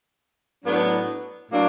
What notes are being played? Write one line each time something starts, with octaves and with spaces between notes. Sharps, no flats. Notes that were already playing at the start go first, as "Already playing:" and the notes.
A2 F#3 B3 D4
A2 F#3 A#3 D4